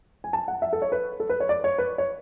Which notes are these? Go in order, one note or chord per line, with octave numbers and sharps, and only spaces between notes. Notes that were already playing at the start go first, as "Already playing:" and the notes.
G#5
A5
F#5
E5
A4
C#5
B4
A4
B4
C#5
D5
C#5
B4
C#5